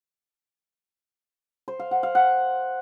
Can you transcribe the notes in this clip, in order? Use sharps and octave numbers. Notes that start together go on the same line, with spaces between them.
C5
F5
F#5
F5
F#5